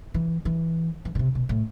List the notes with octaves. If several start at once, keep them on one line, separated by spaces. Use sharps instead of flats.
E3
E3
E3
B2
C3
B2
A2